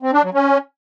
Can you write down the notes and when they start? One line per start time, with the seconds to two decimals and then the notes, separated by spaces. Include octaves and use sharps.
0.03 C4
0.13 D4
0.24 F#3
0.34 C#4